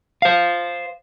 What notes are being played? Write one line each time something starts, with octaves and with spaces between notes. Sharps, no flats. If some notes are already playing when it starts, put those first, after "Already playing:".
C5 F5